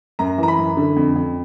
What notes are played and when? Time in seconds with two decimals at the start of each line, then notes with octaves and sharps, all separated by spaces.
0.19 F#2 A#5
0.38 E3 A#5
0.48 B5
0.58 F#2
0.77 D3
0.96 F2
1.16 F2